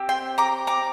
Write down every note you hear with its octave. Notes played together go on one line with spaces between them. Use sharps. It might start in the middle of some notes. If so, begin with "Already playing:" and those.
Already playing: C4 G4
G5 C6
A#5 D6
A#5 D6